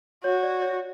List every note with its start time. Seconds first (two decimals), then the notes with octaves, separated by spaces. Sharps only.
0.24 F#4 C#5
0.43 D5
0.62 C#5